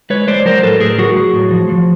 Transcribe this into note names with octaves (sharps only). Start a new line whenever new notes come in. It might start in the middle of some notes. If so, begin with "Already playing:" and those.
G#3 B4 C#5
G#3 C5 D5
F#3 A#4 C5
A2 A4 B4
A2 G#4 A#4
F#3 F#4 G#4
F#3
A2
F3
F3